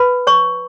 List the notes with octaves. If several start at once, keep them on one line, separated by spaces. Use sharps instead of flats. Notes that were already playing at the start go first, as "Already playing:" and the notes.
Already playing: B4 B5
C#5 C#6